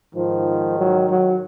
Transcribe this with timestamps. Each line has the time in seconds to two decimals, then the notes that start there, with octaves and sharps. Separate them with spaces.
0.15 G#2 D#3 F3
0.77 F#3
1.08 F#3